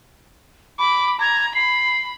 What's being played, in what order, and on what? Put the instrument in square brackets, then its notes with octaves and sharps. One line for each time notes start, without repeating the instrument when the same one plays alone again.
[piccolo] B5 [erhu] D6
[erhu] A#5 [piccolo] G#6
[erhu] B5 [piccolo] C7